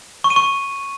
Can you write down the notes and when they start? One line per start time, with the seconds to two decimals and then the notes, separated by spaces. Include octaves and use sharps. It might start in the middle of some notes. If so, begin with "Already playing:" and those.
0.24 C#6
0.30 D#7
0.36 C#6